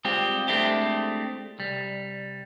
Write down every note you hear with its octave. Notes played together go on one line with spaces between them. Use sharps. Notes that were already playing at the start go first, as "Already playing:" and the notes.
G3 G#3 C4 F4 G4
G#3 A3 C4 D4 E4 G4
C2 G3